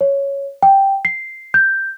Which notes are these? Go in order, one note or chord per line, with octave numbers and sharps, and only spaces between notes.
C#5
G5
C7
G6